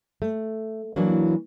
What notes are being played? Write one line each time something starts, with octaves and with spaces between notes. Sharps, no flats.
A3
E3 F#3 A#3 D4